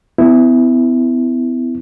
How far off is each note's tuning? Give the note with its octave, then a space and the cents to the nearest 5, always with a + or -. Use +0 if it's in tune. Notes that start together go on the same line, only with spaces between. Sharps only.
B3 +40 E4 +0